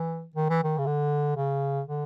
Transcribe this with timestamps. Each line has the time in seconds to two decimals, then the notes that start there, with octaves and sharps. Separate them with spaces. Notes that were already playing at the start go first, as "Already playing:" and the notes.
Already playing: E3
0.36 D#3
0.50 E3
0.64 D#3
0.78 C#3
0.86 D3
1.36 C#3
1.87 D3